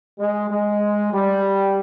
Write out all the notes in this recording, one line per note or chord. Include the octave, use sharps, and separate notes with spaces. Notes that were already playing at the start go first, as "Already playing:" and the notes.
G#3
G#3
G3